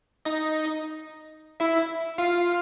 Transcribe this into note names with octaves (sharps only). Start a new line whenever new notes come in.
D#4 D#5
E4 E5
F4 F5